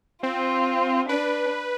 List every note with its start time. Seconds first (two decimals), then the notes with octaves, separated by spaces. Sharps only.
0.23 C4 F4
1.09 D4 B4